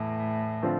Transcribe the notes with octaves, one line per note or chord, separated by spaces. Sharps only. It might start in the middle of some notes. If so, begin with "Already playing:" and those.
Already playing: E2 A2
D3 F3 C4 F4